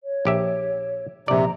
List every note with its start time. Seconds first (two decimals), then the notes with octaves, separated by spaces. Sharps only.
0.04 C#5
0.25 A#1 G4 E5
1.28 A#1 C3 D5 A#5